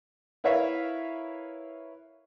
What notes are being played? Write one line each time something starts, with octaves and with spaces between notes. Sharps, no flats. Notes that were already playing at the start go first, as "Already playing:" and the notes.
E4 A#4 B4 C#5 E5 F5